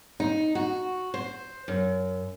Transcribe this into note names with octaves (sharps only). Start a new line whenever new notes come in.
D#4
F#4
C5
F#2